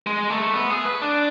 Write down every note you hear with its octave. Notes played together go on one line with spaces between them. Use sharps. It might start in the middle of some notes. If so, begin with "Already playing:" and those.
G#3
A3
B3
G#4
B4
D4